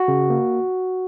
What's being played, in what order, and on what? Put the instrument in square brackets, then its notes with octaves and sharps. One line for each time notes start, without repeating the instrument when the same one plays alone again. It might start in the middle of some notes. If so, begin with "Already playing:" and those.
Already playing: [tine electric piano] F#4
C#3
A#3